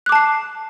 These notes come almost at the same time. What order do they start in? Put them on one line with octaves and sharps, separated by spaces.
F#6 D6 A5 C7